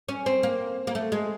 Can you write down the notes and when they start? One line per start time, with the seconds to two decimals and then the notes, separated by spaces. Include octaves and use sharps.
0.08 C#4
0.26 C4
0.43 A#3
0.87 A#3
0.95 A3
1.12 G#3